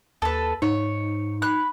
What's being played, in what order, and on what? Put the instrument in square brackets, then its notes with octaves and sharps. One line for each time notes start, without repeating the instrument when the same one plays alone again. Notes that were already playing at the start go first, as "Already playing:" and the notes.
[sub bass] D#2 [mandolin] A4 B4
[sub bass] G#2 [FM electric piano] D#4 [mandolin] C#5
[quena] B5 [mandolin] F#6